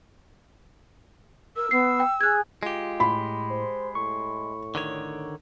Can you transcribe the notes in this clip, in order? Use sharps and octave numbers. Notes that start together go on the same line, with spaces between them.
A#4 E6
B3 C7
G5
G#4 F#6 G#6
G#3 F4 G4
A2 B5 C6
C5
A2 C#6
D3 D#3 C#5